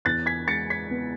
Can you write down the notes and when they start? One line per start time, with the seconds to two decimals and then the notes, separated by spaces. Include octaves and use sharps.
0.05 E2 F#6 A6
0.26 G#6 B6
0.48 G#3 A6 C#7
0.70 G#6 B6
0.91 B3